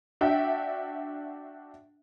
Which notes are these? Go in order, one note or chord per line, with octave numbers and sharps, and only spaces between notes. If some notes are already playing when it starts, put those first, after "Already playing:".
D4 F#4 E5 G5